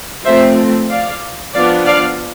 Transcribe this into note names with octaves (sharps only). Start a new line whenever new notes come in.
F3 A3 C4 C5 E5
D5 F5
F3 B3 D4 D5 F5
D5 F5